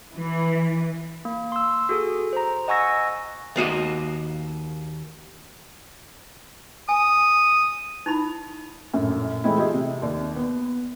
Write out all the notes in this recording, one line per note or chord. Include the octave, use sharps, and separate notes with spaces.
E3
A#3
C6 E6
F#4 G#4 A4
C5 A#5
D#5 F#5 G#5 C#6 E6 A#6
D#2 A#3 F#4 D#5
G#5 D#6
D#4 E4 B5
A#1 F#2 A2
E3 G#3 A3 C4 D#4 E4
F4 G4 G#4 D#5 E5
C3
D#2 D5
B3